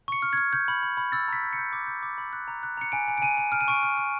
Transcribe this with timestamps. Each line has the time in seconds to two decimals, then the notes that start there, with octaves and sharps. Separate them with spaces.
0.08 C#6 C#7
0.22 F6
0.33 G#6
0.38 F6
0.53 G6 G#6
0.68 B5
0.83 B5
0.97 B5
1.12 E6 A6
1.28 A#5 B6
1.43 G6
1.53 C#7
1.58 G6
1.73 D6
1.87 G6
2.03 D6
2.18 B5
2.33 F#6
2.48 A#5
2.63 F#6
2.77 A#5 C#7
2.92 G#5 D7
3.08 G#5
3.18 D7
3.22 G#5 D#7
3.37 G#5
3.52 F6 D7
3.61 D#7
3.68 C#6 D7
3.83 F6
3.98 F6